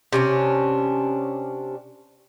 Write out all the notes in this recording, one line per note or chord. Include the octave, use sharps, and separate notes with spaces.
C3 C#4 D4